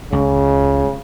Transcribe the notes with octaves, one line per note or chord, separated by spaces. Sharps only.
C#2 C#3